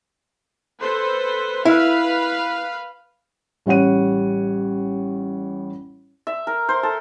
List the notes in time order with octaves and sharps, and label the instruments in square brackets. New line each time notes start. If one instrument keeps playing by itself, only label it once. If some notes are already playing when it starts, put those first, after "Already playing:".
[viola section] A4 B4 C5
[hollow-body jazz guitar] E4 [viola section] B4 F5
[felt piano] A1 G3 C#5 F#5 D#7
[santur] E5
A#4
C5
A4